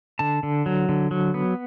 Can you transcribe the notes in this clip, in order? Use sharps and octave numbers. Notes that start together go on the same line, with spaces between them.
D3 A5
D3
F#3
D3
F#3
B3